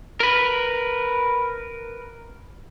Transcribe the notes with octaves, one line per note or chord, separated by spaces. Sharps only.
A#4 B4